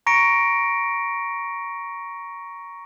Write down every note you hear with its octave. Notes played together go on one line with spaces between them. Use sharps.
A#5 C#6 A#6 C#7 D7